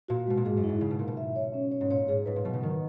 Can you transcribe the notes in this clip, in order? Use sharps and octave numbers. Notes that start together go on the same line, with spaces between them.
A#2 F#4
B2 G#3
A#2
G#2 G#4
F#2
E4
G#2
C#3 E4
B2
A#2 A#4
B2
E5
C#5
C#4
C#5
G#2
A#2 C#5
G#2 G#4
G#2 B4
A#2
B2 F#3
C#3
D#3 A#4